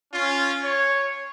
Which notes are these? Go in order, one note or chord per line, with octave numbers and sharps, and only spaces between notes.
C#4 F4
C#5